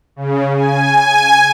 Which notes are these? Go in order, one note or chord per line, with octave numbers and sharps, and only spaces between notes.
C#3
G#5